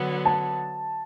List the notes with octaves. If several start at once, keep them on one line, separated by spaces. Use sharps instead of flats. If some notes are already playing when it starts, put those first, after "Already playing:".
Already playing: D3 F#3 B3
A5